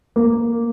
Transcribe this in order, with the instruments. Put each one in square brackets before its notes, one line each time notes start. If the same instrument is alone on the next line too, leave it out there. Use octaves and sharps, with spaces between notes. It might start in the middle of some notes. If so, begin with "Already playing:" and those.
[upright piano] A#3